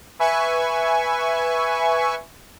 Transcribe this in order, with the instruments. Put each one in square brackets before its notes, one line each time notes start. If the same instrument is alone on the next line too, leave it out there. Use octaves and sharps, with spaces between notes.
[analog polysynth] B4 E5 G#5 C#6